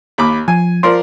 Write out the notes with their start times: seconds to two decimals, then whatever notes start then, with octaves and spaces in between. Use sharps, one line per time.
0.18 D#2 B5 D6
0.48 F3 G#5
0.83 F3 A#4 D5 C6